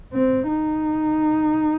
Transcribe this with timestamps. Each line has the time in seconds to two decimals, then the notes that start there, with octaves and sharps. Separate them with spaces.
0.13 C4
0.48 D#4